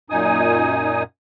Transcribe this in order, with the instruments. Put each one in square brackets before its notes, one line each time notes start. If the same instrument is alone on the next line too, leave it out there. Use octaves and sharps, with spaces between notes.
[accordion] F#2 A#2 D#4 G#5 D#6